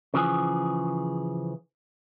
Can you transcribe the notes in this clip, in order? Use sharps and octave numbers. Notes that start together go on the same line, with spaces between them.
C#3 E3 F3 G#4